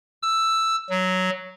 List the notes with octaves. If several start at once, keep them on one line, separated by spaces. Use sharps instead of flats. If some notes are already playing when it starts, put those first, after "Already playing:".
E6
F#3